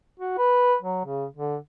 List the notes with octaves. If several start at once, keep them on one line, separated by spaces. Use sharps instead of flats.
F#4
B4
F#3
C#3
D3